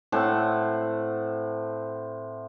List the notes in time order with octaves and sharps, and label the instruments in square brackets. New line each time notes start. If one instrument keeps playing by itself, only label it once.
[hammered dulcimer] A2 C4 F#5 A5